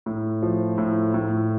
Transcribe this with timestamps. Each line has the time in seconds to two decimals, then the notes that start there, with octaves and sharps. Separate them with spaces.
0.06 A2
0.42 F3
0.78 A2
1.14 A2